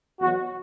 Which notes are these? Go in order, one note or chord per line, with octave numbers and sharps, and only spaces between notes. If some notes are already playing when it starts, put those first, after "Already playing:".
E2 B2 F#3 F#4